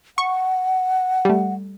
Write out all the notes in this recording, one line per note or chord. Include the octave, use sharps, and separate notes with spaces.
F#5 C#6
G3 A3